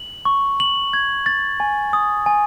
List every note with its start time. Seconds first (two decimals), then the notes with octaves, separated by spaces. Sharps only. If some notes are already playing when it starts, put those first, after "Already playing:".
Already playing: F#7
0.25 C#6
0.60 F#7
0.93 G#6
1.26 A6
1.60 G#5
1.93 D#6
2.26 G#5